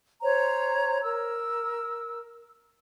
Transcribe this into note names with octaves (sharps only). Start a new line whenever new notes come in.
C5 C#5 A#5
A#4 E6